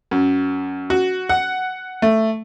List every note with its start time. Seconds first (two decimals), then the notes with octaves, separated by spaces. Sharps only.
0.11 F#2
0.90 F#4
1.29 F#5
2.02 A3